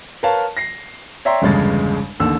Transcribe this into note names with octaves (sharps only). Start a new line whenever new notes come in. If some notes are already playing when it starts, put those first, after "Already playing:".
A#4 B4 C#5 F5 A5
A#6 C7
C#5 D5 E5 G5 A#5 C6
G1 E2 G2 C#3 G#3 A6
A1 D#2 D3 E6